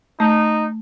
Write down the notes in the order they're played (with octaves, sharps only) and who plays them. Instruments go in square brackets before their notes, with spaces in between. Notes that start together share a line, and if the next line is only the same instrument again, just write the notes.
[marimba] A3 [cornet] D#4